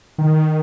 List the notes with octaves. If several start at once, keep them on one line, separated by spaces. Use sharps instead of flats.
D#3